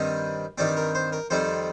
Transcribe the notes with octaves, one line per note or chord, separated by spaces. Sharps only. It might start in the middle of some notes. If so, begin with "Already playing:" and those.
Already playing: G2 D#3 G3 C4 D#5
G2 D#3 G3 C4 D5
A#4
C5
A#4
F2 D#3 G3 C4 C5